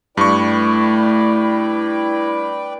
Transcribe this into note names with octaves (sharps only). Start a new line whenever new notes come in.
G2 A3 E4 B4 D5 G5 C#6